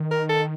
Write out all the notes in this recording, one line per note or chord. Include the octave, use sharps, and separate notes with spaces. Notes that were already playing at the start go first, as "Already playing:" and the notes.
Already playing: D#3
A#4
A4